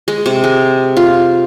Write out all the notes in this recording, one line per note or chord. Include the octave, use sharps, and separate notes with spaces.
G#3
C3
G#3
F4